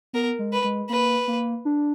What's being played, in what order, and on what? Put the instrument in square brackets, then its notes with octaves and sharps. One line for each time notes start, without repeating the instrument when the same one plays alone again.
[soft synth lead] B3 [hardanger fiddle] A#4
[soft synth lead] G#3
[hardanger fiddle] B4
[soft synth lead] G#3
[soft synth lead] A#3 [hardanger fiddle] B4
[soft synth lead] A#3
D4